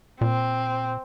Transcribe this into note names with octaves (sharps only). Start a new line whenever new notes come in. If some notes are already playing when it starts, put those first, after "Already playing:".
A#2 C4